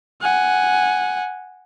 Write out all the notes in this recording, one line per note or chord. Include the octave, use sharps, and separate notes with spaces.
F#5 G#5